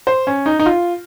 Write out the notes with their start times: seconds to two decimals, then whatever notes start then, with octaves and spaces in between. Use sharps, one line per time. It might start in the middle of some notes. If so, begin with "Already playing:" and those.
0.07 C5
0.27 C#4
0.46 D#4
0.59 D#4
0.66 F4